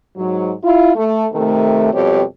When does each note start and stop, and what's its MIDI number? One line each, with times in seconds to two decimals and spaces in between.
0.16 0.52 44
0.16 0.52 54
0.62 0.95 64
0.62 0.95 65
0.96 1.26 57
1.32 1.89 48
1.32 1.89 51
1.32 1.89 57
1.93 2.22 41
1.93 2.22 47
1.93 2.22 55
1.93 2.22 67
1.93 2.22 73